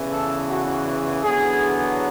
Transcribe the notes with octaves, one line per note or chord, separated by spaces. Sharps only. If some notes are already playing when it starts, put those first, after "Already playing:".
Already playing: E2 C#3 E3
A4
F#4
E2 D3 F#3 B3 G#4